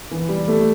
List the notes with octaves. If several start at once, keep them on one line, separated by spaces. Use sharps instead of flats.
E3
G3
A3